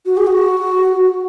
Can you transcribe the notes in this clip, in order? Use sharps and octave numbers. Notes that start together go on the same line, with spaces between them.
F#4
G#4
F#4